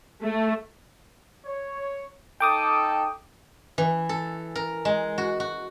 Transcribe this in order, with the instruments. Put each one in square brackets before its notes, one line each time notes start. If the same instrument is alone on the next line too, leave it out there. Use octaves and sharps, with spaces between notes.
[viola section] A3
[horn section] C#5
[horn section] D#4 A4 [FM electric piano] G5 D6 D#6
[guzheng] E3
A4
A#4
G#3
F#4
F#4